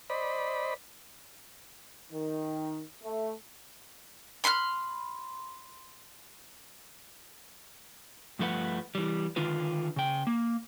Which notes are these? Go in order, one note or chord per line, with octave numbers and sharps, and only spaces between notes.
C5 D5 D#5 B5
D#3
A3
B5 C6 D6 F6
G2 F3 A3 B4 F#5
E3 G3
D3 D#3 D4 F4 B4
C#3 G5
A#3